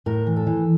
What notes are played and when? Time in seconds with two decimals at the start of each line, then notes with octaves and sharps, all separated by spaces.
0.06 A2 A#4
0.26 E3
0.36 A4
0.47 E3